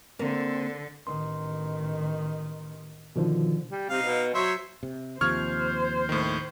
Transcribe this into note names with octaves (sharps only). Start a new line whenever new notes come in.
D3 A#3 C4
A1 D#3 C6
B2 D3 D#3 F3
G3
C3 D#4 F5
B2
F#3 C5 C#5 E5
C3
D#2 C3 F3 C5 C#6 F6 G#6
A2 D#3